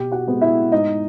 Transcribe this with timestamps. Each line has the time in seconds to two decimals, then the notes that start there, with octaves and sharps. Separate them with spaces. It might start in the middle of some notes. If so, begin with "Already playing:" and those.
Already playing: B2 G4 G5
0.12 F#4 F#5
0.27 G#3 B3
0.41 E4 E5
0.72 G#2 D#4 D#5